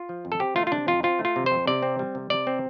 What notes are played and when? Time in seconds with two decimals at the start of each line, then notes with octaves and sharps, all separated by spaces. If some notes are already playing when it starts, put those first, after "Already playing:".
Already playing: F4
0.09 F3
0.25 F2
0.32 A4
0.40 C4 G4
0.56 A3 F4
0.67 F4
0.72 C3 D4
0.87 F2 F4
1.03 C4 F4
1.19 A3
1.25 F4
1.36 C3
1.46 F2 C5
1.67 C3 D5
1.83 C4
1.99 G3
2.15 C3
2.30 C3 D5
2.47 C4